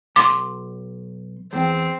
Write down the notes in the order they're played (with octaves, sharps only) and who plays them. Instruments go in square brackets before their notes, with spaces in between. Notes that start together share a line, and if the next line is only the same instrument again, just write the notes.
[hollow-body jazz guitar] B1 C6 [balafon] D6
[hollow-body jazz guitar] E2 [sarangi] C4